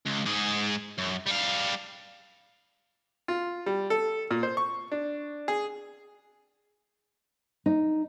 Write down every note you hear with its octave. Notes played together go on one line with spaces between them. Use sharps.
C#2
G#2 G#4
F#2
G3 F5
F4
G3
A4
A#2
C5
C#6
D4
G#4
D#4